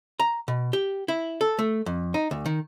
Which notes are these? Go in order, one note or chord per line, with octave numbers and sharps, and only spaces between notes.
A#5
B2
G4
E4
A4
A3
F2
D#4
D2
D#3